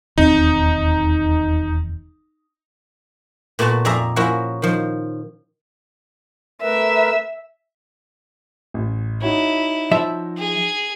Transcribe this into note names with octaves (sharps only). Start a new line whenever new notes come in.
E1 D#2 C4 D#4
A#2 A3 B3 F#4 A5
F2 G#4 D5 E5 G#5 A#5
F3 A#3 C#4 E4 F#4
D#3 F3
A3 A#4 B4 E5
A1
D#4 E4 F#4 C#5
F3 E5
G#4